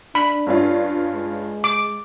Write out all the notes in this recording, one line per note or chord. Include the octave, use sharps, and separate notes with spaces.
D4 B5
G2 C#4 F4
G#3
D6